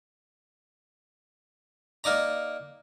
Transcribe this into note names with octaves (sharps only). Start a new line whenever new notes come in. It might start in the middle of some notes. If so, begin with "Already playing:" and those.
A#3 D#4 D5 A#5